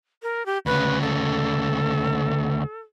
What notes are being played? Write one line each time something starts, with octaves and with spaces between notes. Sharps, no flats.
A#4
G4
D2 C#3 B4
A4